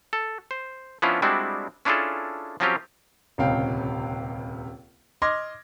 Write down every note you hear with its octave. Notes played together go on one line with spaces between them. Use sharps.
A4
C5
F3 B3 C#4 D4 E4 F4
G3 G#3 C4 D4 E4 F#4
C#4 D4 E4 F4 G#4 A4
F3 F#3 C4 C#4 F4 G4
D#1 C#2 C3 F5 G5
D#5 C6 D6 F6 G#6 A#6